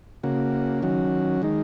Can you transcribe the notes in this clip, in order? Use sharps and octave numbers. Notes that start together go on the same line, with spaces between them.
C#3 A#3 F#4
D#3 F#3 C#4 F#4
D#3 G#3 D#4